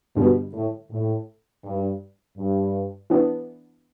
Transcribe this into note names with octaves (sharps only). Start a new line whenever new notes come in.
G2 B2 D3 G3
A2
A2
G2
G2
E3 B3 D4